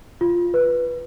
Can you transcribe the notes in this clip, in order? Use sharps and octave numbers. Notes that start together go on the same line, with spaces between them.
F4
B4